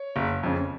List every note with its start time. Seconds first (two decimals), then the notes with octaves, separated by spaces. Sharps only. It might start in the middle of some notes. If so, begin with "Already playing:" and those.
Already playing: C#5
0.16 F#1
0.43 F2 C#3